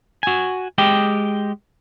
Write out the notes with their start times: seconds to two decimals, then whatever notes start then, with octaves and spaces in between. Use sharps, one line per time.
0.23 F#4 G#5
0.78 G#3 G4 D#5 G5